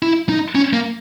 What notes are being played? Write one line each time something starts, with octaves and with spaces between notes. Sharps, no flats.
E4
D#4
C#4
A#3